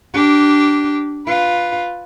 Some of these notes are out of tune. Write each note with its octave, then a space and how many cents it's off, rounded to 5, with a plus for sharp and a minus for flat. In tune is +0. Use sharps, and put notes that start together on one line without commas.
D4 -5 G4 -20
F4 +5 B4 +0